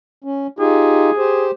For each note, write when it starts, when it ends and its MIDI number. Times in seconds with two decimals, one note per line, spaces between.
0.24 0.47 61
0.59 1.11 63
0.59 1.11 65
0.59 1.11 67
0.59 1.47 68
1.18 1.51 67
1.18 1.51 72